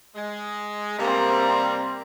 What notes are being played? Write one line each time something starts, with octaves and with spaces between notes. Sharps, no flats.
G#3
C3 G3 A#3 C4 A#5